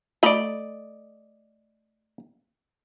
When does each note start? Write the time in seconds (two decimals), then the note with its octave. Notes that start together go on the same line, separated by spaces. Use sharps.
0.23 A3 D5 D#5 A#5 B5